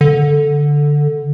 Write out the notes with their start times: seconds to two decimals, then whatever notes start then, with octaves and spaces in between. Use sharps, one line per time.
0.01 D3